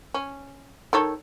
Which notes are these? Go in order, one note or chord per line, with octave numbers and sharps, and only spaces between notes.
C#4
D#3 A4 C#5